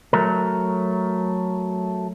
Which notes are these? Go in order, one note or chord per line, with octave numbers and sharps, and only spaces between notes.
F#3 A3 A#4